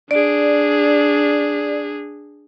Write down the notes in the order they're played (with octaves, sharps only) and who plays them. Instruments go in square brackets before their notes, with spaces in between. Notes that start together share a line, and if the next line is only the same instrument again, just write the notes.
[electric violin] D4 G#4 [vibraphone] D5